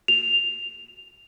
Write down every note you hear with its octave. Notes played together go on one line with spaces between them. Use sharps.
F7